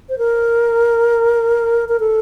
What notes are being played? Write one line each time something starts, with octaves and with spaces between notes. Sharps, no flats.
C5
A#4
A#4
A4